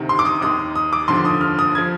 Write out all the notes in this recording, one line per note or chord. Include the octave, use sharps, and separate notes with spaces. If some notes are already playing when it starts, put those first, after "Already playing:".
Already playing: D2 C3 D#3
C6
D6
D#6
D#2 D#3 D#6
D#6
D6
F1 D#2 D3 F3 C6
D#6
F6
D#6
F3 G#6